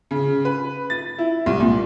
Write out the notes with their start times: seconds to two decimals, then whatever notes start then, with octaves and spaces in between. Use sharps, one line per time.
0.11 C#3
0.45 B4
0.90 A6
1.18 E4
1.46 C2
1.60 A#2